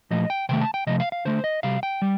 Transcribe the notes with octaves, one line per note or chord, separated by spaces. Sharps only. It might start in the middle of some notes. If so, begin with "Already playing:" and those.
A#2 F3 A3 D#5
G5
C3 D#3 A3 G5
A5
G5
C3 F3 A3 D#5
F5
F5
D3 A3 C5
D#5
C3 G3 F5
G5
G3